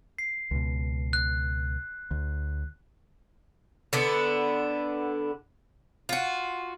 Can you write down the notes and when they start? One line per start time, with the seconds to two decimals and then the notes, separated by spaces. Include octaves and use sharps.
0.18 C7
0.51 C#2 B2
1.13 F#6
2.11 D2
3.93 D3 B3 D4
6.09 F4 F#4